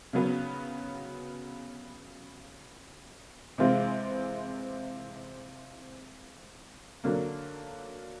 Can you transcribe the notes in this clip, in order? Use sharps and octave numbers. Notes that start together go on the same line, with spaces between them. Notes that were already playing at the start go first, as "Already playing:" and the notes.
C#3 F#3 B3
C3 E3 G#3 C4 F4
D3 F#3 A#3